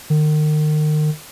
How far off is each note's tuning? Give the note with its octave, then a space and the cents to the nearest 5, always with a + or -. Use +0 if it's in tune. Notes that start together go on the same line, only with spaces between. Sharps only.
D#3 -35